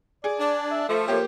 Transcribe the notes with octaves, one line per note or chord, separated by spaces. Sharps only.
G#4 D5
D4
E5
F3 A3 A4
A#3 G4 C#5